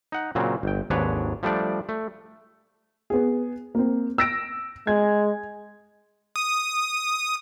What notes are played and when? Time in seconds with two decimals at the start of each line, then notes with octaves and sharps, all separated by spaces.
0.12 D#4 F#5
0.35 A#2 C#3 F#3 C4
0.63 G1 G5
0.90 G#1 D#2 G#2 D4 B4 C#5
1.43 F3 G3 A3 D4 D5
1.89 A3
3.10 B3 G#4
3.75 A#3 C4
4.18 E6 A#6 D7
4.87 G#3 G#6
6.36 D#6